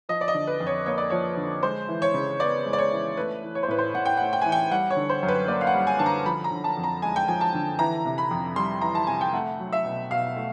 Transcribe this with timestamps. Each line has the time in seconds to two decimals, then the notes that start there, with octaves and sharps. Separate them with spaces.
0.09 F3 D#5
0.21 D5
0.28 D#5
0.34 D3
0.47 B4
0.60 F2
0.67 C#5
0.86 A#3 C#5
0.98 D5
1.10 F3 C#5
1.37 D3
1.63 G#3 C5
1.88 E3
2.02 C#5
2.14 C#3
2.40 B3 D5
2.66 G#3
2.73 D5
2.78 C#5
2.91 E3
3.17 A3 B4
3.43 E3
3.55 C#5
3.63 C5
3.68 A2 B4
3.79 C5
3.94 A2 F#5
4.06 G5
4.17 A3 F#5
4.33 G5
4.41 E3 G#5
4.52 G5
4.71 G3 F#5
4.91 C#5
4.96 D3
5.10 C5
5.23 F#2
5.28 B4
5.48 A#3 D5
5.61 F5
5.67 F#5
5.73 G3
5.87 G#5
5.99 D3 A5
6.06 A#5
6.26 F3 B5
6.44 A#5
6.51 D3
6.64 A5
6.77 F2
6.84 A#5
7.02 G#3 G#5
7.16 G5
7.28 F3 G#5
7.41 A5
7.54 D3
7.79 E3 A#5
8.05 C3
8.18 B5
8.31 F2
8.56 G3 C6
8.81 E3 A#5
8.95 A5
9.07 C3 G#5
9.21 G5
9.33 A3 F#5
9.59 F#3
9.72 E5
9.85 B2
10.11 B2 F5
10.36 A3